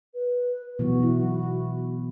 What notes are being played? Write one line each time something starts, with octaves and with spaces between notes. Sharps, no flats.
B4
B2 E3 F#3 F#4
E4